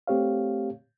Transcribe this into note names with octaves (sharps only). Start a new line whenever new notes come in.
A3 C4 G4 C#5 F5